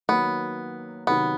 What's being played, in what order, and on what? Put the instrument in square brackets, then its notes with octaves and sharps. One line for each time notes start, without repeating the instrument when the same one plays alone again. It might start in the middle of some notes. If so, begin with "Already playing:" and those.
[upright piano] D#3 F#3 A#3 [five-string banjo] B3
[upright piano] C3 D#3 F#3 [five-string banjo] B3